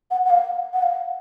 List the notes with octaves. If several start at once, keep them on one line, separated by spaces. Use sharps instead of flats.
F#5
F#5
F5
F#5
F5